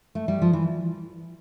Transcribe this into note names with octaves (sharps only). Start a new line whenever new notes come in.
A3
G3
F3
E3